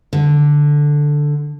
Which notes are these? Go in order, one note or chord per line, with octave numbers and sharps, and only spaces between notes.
D3